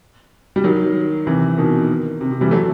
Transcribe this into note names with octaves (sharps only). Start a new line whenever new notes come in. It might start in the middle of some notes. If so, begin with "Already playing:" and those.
G3
D#3 F#3
C3 E3
B2 D#3
C3
C3
E3 G3
F#3 A3